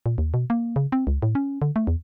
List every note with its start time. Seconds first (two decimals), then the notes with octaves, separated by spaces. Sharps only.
0.06 A#2
0.18 D#2
0.34 B2
0.50 A#3
0.76 C#3
0.92 C4
1.07 C#2
1.22 A2
1.35 C#4
1.62 D3
1.76 A3
1.87 E2